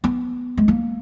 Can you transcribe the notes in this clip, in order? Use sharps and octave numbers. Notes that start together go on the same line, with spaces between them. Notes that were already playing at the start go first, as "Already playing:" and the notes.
B3
G#3
A#3